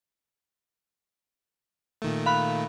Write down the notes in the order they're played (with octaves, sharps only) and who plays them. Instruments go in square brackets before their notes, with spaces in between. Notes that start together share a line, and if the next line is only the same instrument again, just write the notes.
[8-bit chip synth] A#2 D#3 A3
[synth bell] F5 B5 F#6